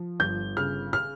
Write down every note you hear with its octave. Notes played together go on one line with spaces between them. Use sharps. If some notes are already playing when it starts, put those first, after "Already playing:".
Already playing: F3
G1 G6
C#3 F6
F6